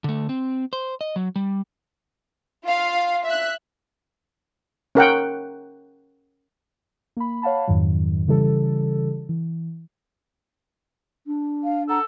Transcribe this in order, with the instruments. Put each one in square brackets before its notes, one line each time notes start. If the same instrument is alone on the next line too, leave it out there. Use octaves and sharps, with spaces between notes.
[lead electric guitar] D3 A3
C4
C5
D#5
F#3
G3
[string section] F4 F5
E5 F#6
[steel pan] C#4 A#4 F#5 G5
[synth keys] A#3 B5
C#5 F5 F#5 A5 B5
F2 G#2 D#3 F#3
C#3 E3 G3 A4
E3
[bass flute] D4
[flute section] F5
[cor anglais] A4 [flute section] F#5 A#5